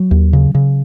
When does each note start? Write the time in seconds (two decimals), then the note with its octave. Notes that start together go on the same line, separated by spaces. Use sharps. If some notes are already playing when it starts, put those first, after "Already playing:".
Already playing: F#3
0.11 D#2
0.33 C#3
0.55 C#3